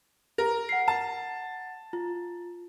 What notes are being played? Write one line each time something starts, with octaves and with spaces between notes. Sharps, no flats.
A#4
F#5 C7
A5
F4